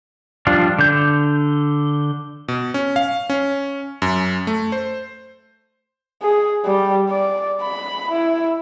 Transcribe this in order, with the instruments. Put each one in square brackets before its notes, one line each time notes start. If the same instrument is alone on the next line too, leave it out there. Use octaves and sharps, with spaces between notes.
[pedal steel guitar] F3 G3 D4 F4
D3 G6
[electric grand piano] B2
C#4
F5
C#4
F#2
A3
C5
[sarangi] G#4
G3
D5
B5
E4